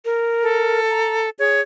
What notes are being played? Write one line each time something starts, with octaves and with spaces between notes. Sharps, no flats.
A#4
A4
A#5
G#4 C#5